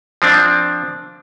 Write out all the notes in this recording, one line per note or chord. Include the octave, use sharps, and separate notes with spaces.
F3 C4 D4